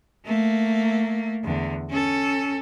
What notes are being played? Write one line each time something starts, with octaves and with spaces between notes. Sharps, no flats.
A3 A#3
E2 D3
C#4 A4